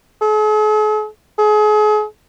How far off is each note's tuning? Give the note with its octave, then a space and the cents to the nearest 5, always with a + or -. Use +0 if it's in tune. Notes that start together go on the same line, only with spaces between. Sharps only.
G#4 +45
G#4 +35